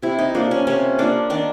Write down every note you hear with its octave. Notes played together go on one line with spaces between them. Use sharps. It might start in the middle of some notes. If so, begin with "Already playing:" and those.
C3 E4
D#4
F3 A#3 D4
C#4
C3 C#4
F3 A#3 D4
D#3 D4